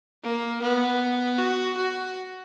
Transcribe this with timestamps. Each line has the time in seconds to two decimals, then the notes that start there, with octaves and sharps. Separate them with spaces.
0.23 A#3
0.62 B3
1.39 F#4
1.77 F#4